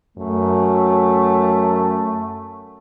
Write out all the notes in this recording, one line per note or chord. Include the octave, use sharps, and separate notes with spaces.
F#2 A3